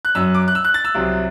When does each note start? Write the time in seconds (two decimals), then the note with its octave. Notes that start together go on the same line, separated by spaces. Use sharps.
0.05 F#6
0.15 F#2 F#3 E6
0.35 D6
0.48 F#6
0.55 E6
0.65 F#6
0.74 A6
0.85 E6
0.94 C2 C3 F#3